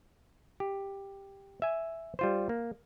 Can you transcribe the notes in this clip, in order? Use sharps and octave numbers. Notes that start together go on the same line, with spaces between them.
G4
E5 G#5
G3 F4 C5
A#3